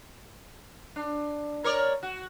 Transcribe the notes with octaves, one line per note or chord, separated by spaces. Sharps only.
D4
A#4 C#5 D5
F#4